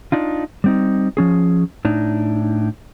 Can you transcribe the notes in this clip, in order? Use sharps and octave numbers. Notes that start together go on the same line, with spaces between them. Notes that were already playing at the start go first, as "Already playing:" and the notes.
D4 D#4 F4
G3 C4 D#4
F3 C#4 G#4
A2 D4 D#4